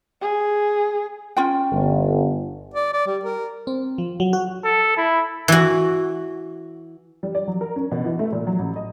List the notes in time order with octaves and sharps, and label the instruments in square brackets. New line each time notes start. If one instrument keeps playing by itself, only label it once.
[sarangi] G#4
[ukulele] C#4 F4 G5
[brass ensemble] G1
[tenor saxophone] D5
D5
G3
A#4
[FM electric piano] C4
F3
F#3
F#4
[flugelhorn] A4
E4
[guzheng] E3 F#4
[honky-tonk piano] G3
D5
F#3
A#4
C#4
B2
E3
A3
A#2
F#3
A1
D#5